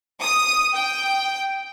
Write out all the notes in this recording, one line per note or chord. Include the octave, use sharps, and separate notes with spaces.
D#6
G5